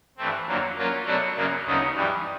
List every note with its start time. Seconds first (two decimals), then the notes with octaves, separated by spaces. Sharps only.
0.18 G2 E3 A3 C4
0.46 F2 D3 F#3 A#3
0.76 F#3 A#3 C#4 F4
1.05 B2 F#3 A3 D4 F#4
1.35 F#2 C#3 F#3 A#3
1.64 D2 C#3 F#3 B3 D#4
1.94 G2 E3 G3